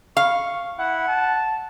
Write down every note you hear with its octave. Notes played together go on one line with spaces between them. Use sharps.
F5 C#6
E4 F#5
A5